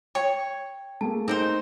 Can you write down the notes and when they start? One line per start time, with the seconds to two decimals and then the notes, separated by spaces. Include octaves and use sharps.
0.15 C#5 G5
1.01 A3 A#3 G#4 A5
1.28 C4 D#4 A#4 C5